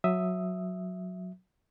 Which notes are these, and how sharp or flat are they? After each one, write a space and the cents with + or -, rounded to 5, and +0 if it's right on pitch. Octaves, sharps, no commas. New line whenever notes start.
F#3 -15 E5 +0 D#6 +0